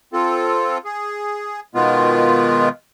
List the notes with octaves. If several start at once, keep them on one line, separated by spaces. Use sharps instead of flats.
C4 F4 A4
G#4
B2 D#3 G#3 B3 F4